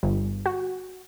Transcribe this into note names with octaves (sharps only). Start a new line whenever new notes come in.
G1
F#4